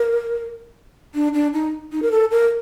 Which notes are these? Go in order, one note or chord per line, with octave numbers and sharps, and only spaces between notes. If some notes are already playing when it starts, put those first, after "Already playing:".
Already playing: A#4
D4
D4
D#4
D#4
A#4
A4
A#4